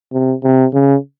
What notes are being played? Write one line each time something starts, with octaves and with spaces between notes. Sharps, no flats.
C3
C3
C#3